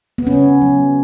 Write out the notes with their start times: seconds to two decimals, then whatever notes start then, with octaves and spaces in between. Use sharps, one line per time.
0.18 B3
0.27 C#3 C#4
0.62 F#3